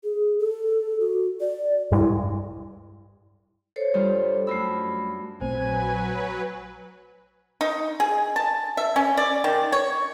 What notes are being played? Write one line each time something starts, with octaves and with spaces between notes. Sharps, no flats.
G#4
A4
F#4
D5
G2 G3 G#3 E4
A4 C5 C#5
G2 G3 F4
F#2 A3 B5 E6
A#1 F#3 A3 C4 B4 C5 G#5
D#4
G#4
A5
E5
C#4
D5
D#3
C#5